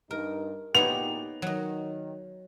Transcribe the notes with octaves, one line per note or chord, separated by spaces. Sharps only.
G2 D#4 A#4
D2 A#2 B3 D#4 G4 C#5 F7
D#3 F#3 D#5